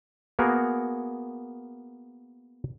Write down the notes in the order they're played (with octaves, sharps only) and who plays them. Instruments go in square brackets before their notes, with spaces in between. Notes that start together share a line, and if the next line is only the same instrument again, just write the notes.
[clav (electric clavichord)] A#3 B3 F#4 G#4 A#4